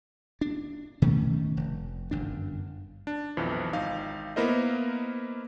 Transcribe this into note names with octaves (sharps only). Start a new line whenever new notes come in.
D4
B2 D#3 A3 C#4
F1
G1 F#2 D4
D4
B1 F2 E3 F3
G#1 D#4 F5
A#3 B3 E4 A#4 C5 D#5